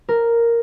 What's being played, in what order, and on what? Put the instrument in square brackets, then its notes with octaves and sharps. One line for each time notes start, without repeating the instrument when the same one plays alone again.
[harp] A#4